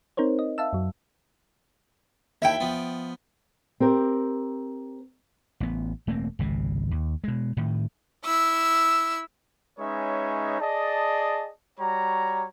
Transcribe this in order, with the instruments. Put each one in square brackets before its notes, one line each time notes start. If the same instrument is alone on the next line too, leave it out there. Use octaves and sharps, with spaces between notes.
[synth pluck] C4 D#4 A#4 C5 C#5
D#5
E5 F5 A5 E6
F#2 F#3
[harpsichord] D#2 E4 [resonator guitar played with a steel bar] E5 G5
[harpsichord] F3 B3
[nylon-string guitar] C4 G4 A#4
[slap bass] A1 B3
E1 A3 A#3 C4
G#1 C#2 C3
D#2
B2 G#3
A2 D#3
[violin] E4 E6
[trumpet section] G#3 C#4 D#4 B4 C#5 E5
G#4 D5 D#5 A5
G3 F#4 C#5 A#5